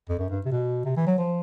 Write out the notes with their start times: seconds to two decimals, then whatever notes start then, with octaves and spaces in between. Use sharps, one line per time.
0.09 F2
0.19 F#2
0.30 G2
0.45 C3
0.52 B2
0.85 C3
0.96 E3
1.07 F#3
1.18 F3